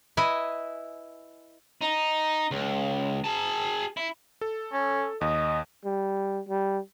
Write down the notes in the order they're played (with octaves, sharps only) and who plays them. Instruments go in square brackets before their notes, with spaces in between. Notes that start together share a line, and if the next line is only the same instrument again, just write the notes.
[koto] E4 B4 D#5 G#5
[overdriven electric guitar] D#4
C#2
G#4 A5
E4
[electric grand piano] A4
[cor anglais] C#4
[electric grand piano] D#2 [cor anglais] D#5
[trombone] G3
G3